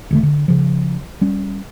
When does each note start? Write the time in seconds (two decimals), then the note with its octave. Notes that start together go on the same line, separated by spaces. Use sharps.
0.11 E1 D3 A3
0.23 D3
0.48 C#3 F3
1.21 G3 C#4